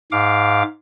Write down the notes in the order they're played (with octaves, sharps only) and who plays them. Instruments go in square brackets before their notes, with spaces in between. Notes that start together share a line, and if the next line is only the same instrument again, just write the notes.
[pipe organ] G#2 F5 D6